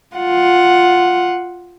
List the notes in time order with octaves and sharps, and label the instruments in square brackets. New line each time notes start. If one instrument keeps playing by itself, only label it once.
[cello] F4 F#5